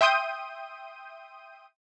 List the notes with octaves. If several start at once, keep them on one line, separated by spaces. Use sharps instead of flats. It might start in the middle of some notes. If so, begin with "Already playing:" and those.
E5 G5 C6 D#6 G6 D#7